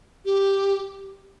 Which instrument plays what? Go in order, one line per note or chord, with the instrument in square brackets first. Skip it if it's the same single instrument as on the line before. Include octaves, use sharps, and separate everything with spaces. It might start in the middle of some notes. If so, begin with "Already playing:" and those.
[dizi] G4